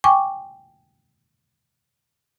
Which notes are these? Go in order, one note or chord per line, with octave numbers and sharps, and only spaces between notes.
G5 G#5 C#6 D6